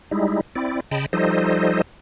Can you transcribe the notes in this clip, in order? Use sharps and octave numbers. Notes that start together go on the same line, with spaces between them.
G3 G#3 D#4 E4
C4 E4 D5
C#3 D#5 G5 A5 B5
F3 G3 D#4 A4 C5 D#5